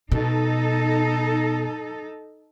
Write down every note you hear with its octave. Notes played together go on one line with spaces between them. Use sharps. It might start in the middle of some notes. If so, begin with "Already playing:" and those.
B2 D#4 A4